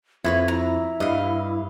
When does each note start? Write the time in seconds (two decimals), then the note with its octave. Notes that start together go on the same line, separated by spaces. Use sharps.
0.24 F2 E4 F4 B4 C#5
0.48 E4 A#5
1.00 G2 D#5 F5